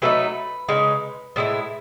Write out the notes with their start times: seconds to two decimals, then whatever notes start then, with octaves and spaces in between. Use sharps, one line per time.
0.02 F#3 A3 D#4 G#4 B4
0.69 C#3 G#3 D#4
1.36 A2 G#3 C#4 E4